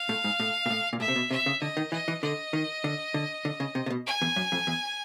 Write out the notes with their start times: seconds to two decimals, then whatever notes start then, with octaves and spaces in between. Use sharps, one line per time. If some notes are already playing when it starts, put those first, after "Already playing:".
Already playing: F5
0.09 A2
0.24 G#2
0.40 A2
0.66 A#2
0.70 A2
0.93 A#2
1.00 A2 E5
1.08 C3
1.16 B2
1.30 C3 E5
1.46 C#3
1.61 D3 D#5
1.77 D#3
1.92 E3 D#5
2.08 E3
2.23 D3 D#5
2.53 D#3
2.84 D3
3.14 D3
3.45 D3
3.60 C#3
3.75 C3
3.86 C3
3.90 B2
4.07 G#5
4.22 E2
4.36 F#2
4.52 F2
4.67 E2